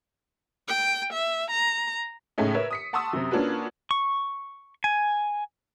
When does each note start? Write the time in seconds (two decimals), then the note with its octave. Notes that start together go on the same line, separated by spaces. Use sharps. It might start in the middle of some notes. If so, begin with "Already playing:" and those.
0.68 G5
1.13 E5
1.51 A#5
2.38 A2 C#3 G#3 A3 C#4 D#4
2.54 A#4 B4 C#5 E5
2.71 D#6 B6 C#7
2.93 F#5 A5 C6 C#6 D#6 E6
3.13 F#2 C3
3.31 A#3 C#4 D4 F4 F#4 B4
3.91 C#6
4.84 G#5